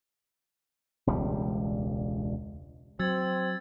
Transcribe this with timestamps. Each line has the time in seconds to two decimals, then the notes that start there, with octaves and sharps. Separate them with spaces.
1.07 E1 C#2 G3
2.99 F#3 C4 E6 G#6 A6